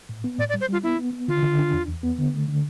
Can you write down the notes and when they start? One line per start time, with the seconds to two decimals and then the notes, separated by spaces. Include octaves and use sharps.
0.09 A2
0.24 B3
0.39 A2 D5
0.49 D5
0.54 G3
0.61 C5
0.69 G3 F4
0.83 B3 E4
0.99 B3
1.13 B3
1.28 D3 F4
1.43 D3
1.59 D4
1.73 E2
1.88 E2
2.03 B3
2.18 D3
2.34 A3
2.48 D3